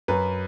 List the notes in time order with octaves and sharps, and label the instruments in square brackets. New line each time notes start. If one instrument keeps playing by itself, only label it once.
[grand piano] F#2 B4